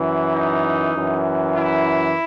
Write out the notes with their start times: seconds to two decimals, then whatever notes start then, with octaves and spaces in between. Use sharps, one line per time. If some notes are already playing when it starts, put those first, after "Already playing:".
Already playing: F#2 E3
0.33 D#4
0.94 F#2 E3
1.56 E4